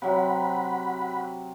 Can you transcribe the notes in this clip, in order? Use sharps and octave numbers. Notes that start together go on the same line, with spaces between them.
C3 F#3 F#5 B5